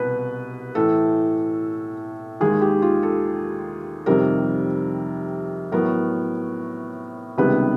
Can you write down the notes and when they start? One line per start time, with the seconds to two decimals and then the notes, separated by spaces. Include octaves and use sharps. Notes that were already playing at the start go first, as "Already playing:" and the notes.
Already playing: C2 B2 B4
0.75 A2 E3 A3 A4
2.41 D#2 D#3 G#3 G#4
2.62 G4
2.82 F4
3.03 A4
4.06 F2 C3 D#3 G3 A#4
5.72 A2 F#3 B3 A#4
7.38 C#2 C3 D#3 G3 B3 B4